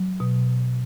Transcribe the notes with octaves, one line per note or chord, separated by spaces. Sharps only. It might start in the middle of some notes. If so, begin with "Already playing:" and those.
Already playing: F#3
B2